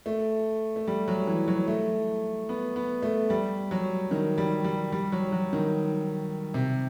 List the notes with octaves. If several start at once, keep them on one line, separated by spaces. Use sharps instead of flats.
A3
A3
G3
F#3
E3
F#3
A3
B3
B3
A3
G3
F#3
D#3
G3
G3
G3
F#3
F#3
D#3
C3